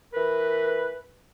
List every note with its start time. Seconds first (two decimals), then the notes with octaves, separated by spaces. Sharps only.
0.14 E3 A#4 B4